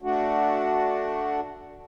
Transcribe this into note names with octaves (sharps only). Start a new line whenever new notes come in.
A3 D4 F#4